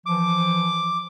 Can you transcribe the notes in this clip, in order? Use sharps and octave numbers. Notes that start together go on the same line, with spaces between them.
E3 F3 D6